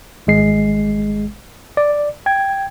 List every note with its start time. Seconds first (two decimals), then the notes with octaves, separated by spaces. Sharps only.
0.27 G#1 G#3 C7
1.77 D5
2.26 G5 G#6